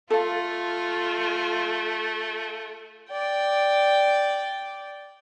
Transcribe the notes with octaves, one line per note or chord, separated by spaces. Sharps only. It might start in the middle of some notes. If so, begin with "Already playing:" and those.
A3 F4 A4 F5
D5 G5